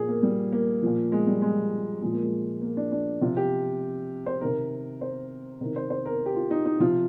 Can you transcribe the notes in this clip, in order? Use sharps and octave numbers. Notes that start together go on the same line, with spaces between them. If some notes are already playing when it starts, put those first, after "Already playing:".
Already playing: A#2 F3 G#4 A#4
A#3
G3
A#3
A#2 F3
G#3
G3
G#3
A#2 F3 G#3
A#3
G#3
A#3
D4
D4
C3 F3 F4
G4
C5
C3 D#3 A#4
C5
C3 D#3 A#4
C5
C5
A#4
G4
F4
D#4
D#4
C3 F3 F4